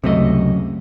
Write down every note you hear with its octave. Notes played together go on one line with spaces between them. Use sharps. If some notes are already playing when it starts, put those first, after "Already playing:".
C#2 F#2 C3 A3 D#5